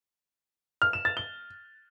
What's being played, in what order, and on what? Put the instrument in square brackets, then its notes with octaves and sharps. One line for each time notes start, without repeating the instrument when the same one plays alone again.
[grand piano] F6
E7
A6
G7